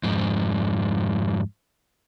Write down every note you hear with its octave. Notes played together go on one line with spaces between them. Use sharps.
F2 G#2